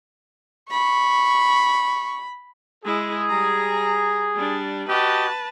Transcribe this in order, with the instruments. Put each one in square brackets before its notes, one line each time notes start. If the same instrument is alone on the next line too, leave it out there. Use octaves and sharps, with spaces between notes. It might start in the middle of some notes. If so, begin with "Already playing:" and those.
[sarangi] B5 [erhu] C#6
[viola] G#3 E4 [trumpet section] G#4
[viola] G3 A#5
G3 D4
[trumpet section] F#4 G4 D#5 [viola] B4 A5